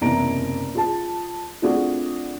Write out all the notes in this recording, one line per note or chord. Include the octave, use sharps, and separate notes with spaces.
F#1 E2 C3 A#5 D7
F4 G#4 A5
A3 C4 D4 F4 F#4 G#4